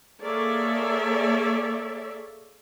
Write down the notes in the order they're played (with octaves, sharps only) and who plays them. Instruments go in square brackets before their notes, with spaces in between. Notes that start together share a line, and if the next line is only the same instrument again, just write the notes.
[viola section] A#3 G#4 A4 C#5 D5 E5